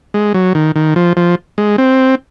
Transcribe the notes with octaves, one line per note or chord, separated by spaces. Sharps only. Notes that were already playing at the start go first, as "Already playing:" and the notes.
G#3
F#3
D#3
D#3
F3
F3
G#3
C4